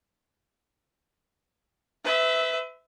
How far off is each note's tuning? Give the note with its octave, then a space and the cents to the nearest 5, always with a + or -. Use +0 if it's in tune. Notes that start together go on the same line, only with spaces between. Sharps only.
B4 +30 E5 -15